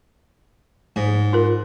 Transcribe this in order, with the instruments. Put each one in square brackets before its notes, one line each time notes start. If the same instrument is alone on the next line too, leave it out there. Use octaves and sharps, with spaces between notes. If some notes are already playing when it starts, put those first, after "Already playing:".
[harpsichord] G#2
[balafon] F4 A#4